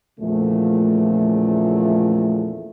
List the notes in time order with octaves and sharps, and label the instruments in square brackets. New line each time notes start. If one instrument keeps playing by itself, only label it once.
[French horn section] E2 A#2 C#3 F3 A3